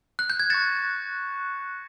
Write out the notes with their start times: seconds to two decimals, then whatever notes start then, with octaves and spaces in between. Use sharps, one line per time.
0.19 F#6
0.30 G6
0.40 G#6
0.50 C#6 F#6 A6 A#6 C#7 E7